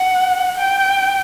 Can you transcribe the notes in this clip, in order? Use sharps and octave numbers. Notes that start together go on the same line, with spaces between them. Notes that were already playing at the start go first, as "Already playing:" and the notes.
Already playing: F#5
G5